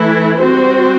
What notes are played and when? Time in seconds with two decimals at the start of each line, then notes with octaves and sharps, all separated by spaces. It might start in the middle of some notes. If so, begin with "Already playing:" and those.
Already playing: E3 A3 E4
0.40 G3 C4 F#4 C5